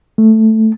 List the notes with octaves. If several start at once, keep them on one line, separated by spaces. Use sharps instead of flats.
A3